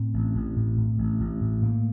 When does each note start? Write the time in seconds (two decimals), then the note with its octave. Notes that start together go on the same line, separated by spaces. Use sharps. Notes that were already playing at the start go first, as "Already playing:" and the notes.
Already playing: A2 C4
0.14 A1
0.35 A1
0.56 A2
0.77 A2
0.98 A1
1.20 A1
1.41 A2
1.62 A2 A#3